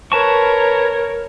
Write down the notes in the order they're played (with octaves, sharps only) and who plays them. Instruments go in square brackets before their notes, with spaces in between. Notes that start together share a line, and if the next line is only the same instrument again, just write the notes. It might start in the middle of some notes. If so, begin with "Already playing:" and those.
[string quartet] A#4 C#5 [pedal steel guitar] B4 A5 C#6